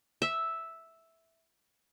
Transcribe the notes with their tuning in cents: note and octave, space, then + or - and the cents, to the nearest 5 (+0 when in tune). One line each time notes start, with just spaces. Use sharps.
E5 -5